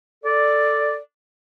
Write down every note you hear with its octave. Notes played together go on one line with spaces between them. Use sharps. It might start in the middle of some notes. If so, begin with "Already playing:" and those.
A4 D5